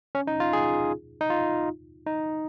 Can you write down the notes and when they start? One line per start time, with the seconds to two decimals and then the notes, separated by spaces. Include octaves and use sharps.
0.15 C#4
0.27 D#4
0.40 F4
0.53 G#4
1.21 D#4
1.30 F4
2.06 D#4